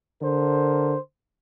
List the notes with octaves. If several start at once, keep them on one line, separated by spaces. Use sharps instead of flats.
D3 A#4 C5